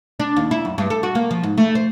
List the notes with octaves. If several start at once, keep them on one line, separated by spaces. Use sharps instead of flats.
D4
D#2
E4
F#2
G2
A4
F#4
A#3
F3
G#2
A3
C5